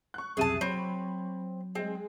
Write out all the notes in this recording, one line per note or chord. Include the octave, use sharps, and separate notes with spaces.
C#6 F#6
B1 F2 C3 G#4 E5 A5 D#7
F#3 C4 C#5 B5
G#3 C4 G#4